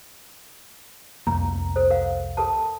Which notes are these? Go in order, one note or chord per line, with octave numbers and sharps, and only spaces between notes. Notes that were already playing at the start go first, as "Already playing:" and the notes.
C2 F2 A#3 A#5
A4 C5
A#4 F5 F#5
A4 A#4 A5